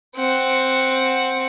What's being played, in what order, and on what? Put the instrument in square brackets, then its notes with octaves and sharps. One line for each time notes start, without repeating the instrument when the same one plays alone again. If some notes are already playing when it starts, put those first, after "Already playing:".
[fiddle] C4 F#5